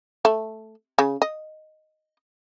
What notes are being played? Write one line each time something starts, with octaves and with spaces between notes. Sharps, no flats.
A3
C#3
D#5